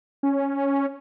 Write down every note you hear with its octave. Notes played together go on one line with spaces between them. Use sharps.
C#4